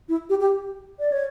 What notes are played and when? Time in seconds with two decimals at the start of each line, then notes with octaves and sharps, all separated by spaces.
0.09 E4
0.30 G4
0.40 G4
1.00 D5
1.12 C#5